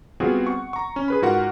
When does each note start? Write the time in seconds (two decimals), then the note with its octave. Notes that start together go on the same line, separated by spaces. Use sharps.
0.20 G3 B3 C4 F4 F#4 G#4
0.47 F#5 C#6
0.73 A#5 C#6
0.96 C#4
1.08 G#4 B4 B5
1.22 G#2 F4 F#4 A#4 F#5